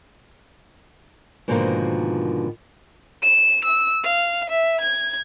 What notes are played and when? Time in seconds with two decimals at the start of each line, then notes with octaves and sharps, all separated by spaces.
1.48 G#2 B2 D3 D#3 F3 A#3
3.23 E7
3.65 E6
4.04 F5
4.50 E5
4.81 G#6